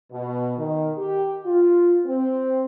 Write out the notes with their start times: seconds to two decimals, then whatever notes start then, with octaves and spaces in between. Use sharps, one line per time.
0.12 B2
0.57 D#3
0.98 G4
1.46 F4
2.06 C4